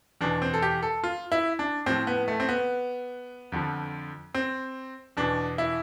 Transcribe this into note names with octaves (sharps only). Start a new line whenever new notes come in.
E2 B2 D4
C4
A4
G4
A4
F4
E4
D4
A2 F3 C4
B3
A3
C4
B3
F2 D3 F3
C4
E2 B2 D4
E4